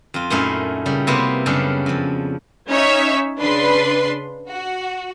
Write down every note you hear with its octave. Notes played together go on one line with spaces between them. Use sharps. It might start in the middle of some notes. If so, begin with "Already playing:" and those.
F2 F4
F#2 A#2 A3 D#4 E4 F5
C#3 G3
C3 A#3 B3 E4 C5 E5
F#2 C#3 G3 D4 A4 F5
F2 F3
C#4 D#4 C#5 E5
C#3 D4 B4 C6
F#4